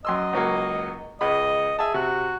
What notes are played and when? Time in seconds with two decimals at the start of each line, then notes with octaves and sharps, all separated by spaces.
0.05 F#2 D#5 C6 E6
0.33 C#2 F#3 A#3
1.21 C#2 G#3 D#5 B5
1.79 G#4 E5 A5
1.94 C3 F#4